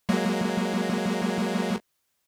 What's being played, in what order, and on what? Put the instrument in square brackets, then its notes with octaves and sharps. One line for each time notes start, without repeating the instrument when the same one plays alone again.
[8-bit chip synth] F#3 G#3 A#3